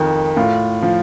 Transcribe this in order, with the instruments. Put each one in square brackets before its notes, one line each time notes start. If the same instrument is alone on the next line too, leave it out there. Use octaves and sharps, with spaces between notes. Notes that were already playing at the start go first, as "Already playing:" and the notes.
Already playing: [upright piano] F2 D#3
A2 F4
F3